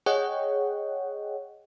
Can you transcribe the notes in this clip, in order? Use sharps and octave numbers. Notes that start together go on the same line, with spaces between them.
G#4 C#5 D#5 F#5 G5